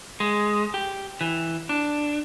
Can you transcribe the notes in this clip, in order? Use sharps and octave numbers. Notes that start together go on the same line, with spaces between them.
G#3
G4
E3
D4